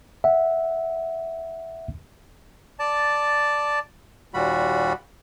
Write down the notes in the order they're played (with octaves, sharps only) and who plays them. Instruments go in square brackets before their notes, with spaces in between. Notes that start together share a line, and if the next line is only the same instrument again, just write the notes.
[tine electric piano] E5 F#5
[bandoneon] D5 A5
D#2 A#2 G3 F#4 B5